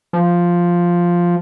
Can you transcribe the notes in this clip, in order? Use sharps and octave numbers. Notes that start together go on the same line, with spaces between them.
F3